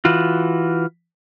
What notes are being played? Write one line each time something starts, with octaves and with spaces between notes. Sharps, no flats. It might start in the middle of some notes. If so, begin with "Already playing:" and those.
E3 F4 F#4